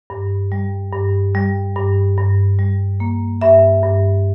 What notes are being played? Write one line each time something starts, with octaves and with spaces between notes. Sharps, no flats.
G2
G3
G2
G3
G2
G2
G3
A#3
G2 E5
G2